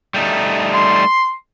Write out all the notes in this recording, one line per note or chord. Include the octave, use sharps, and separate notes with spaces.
G3 A3 D#4
C6